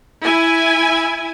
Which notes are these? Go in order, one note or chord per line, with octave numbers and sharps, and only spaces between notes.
E4 G#5